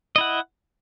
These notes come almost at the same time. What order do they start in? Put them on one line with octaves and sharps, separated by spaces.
D#5 E4 F#5